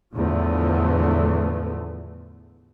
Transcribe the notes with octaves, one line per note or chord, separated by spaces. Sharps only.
E2 A2 D3 F3 A3